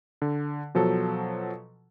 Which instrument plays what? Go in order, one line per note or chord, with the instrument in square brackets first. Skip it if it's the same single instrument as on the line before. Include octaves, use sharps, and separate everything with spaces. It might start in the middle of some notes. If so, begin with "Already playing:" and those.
[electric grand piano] D3
B2 F3 F#3 A4